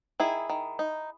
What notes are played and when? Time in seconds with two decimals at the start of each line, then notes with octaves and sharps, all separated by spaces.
0.20 D#3 E4 G#4
0.49 D#3
0.79 D#4